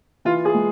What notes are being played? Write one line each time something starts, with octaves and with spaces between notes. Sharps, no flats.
E3 F4
G#4
G#3